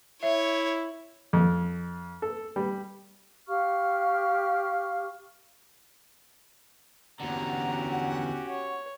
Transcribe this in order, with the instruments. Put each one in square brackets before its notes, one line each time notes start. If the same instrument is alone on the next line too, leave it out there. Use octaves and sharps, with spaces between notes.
[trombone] E4 [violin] C#5 [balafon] E5
[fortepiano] F2
A4
G3
[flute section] G4 F5 C#6 F6
[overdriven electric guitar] E2 D3 [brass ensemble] C#4 F#4 G4 [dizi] F#5 [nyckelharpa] A#5
[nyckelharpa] C#5